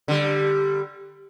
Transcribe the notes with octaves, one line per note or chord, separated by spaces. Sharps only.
D3 G3